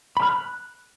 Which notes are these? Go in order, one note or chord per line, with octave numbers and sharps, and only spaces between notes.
B5
F6
F#6